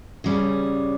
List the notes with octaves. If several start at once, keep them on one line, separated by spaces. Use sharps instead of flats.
C#3 G3 C#4